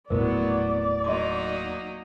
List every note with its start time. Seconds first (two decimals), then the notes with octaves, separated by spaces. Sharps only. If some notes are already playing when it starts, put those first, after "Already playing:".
0.10 D#1 A2 F#3 B3 A#4 C5 D5
1.04 F#3 A#3 D#4 D#5 C6 D6